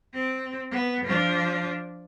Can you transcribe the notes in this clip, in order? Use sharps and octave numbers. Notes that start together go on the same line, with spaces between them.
C4
B3
F3 D4